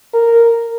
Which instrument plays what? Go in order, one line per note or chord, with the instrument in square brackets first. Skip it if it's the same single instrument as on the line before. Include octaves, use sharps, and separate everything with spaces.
[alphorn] A#4